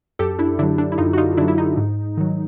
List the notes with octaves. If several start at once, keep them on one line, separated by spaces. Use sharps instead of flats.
F#2 G4 A4
D4 E4
D3 F#3 D4 E4
D4
E4
F#2 D#4 F4
F#4
D#4 F4
D3 F#3 D4 E4
E4
D#4
G#2
D#3 F#3